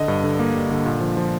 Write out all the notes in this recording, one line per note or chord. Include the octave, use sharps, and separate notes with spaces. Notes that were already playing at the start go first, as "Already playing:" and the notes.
Already playing: D3 D#5
G2
D3
A#3
G3
D3
A#2
F3
F3